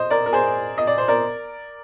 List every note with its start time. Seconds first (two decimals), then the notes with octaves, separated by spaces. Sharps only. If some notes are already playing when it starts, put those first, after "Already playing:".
Already playing: C5 D#5
0.11 A#4 D5
0.26 A#4
0.33 G#4 C5
0.78 D#5
0.87 D5
0.98 C5
1.08 A#4 D5